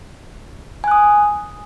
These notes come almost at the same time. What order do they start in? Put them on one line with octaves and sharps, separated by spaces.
G#5 F#6 D#6